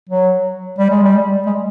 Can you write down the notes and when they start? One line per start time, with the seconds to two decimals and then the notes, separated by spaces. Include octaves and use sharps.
0.09 F#3
0.78 G3
0.90 G#3
1.04 G3
1.46 G#3